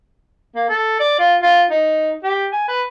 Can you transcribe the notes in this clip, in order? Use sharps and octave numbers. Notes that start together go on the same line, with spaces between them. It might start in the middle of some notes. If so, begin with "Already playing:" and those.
A#3
A4
D5
F4
F4
D#4
G4
G#5
B4